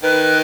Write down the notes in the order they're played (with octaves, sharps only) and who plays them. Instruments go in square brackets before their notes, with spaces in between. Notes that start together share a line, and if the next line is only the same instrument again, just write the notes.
[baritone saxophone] D#3 [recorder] B4